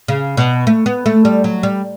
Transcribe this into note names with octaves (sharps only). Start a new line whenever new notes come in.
C#3
B2
A3
B3
A3
G3
F#3
G3